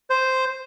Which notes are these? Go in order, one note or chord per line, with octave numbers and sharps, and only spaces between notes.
C5